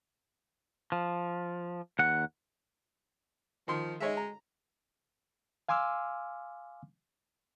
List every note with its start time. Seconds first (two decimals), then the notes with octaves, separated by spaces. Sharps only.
0.92 F3
1.99 D#2 F#5
3.68 D#3 F3 C6
4.00 G#3 D#4 C#5 E5
4.17 A#5
5.69 F5 G#5 C6 D6 E6 F6